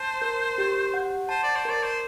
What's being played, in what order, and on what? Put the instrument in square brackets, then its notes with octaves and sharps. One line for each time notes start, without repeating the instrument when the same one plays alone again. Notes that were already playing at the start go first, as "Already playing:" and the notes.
Already playing: [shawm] C5 [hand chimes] A5
[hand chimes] A#4
G4
F#5
[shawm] C5 [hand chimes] A5
[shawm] D5
C5
[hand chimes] A#4 [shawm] D5
[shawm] C5